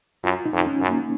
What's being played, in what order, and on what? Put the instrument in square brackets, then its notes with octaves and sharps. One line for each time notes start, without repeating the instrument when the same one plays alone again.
[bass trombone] F#2 [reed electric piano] F4
[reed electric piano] D#4
[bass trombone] F2
[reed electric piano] C#4
[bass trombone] F#2
[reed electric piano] A#3